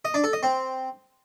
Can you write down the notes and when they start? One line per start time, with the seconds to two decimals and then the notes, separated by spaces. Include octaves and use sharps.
0.05 D#5
0.14 D4
0.24 A4
0.33 D#5
0.43 C4